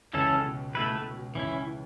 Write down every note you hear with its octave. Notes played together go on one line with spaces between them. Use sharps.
C#2 C#3 E3 C#4 A4
B2
B2 A3 E4 B4
B2
B2
C#2 C#3 E3 C#4 E4
E3